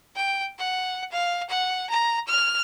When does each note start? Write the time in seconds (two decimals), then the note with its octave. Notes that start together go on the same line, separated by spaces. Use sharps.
0.16 G5
0.59 F#5
1.12 F5
1.50 F#5
1.90 A#5
2.28 F6